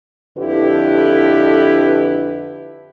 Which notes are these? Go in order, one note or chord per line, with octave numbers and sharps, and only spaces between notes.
F2 D3 E4 G4 B4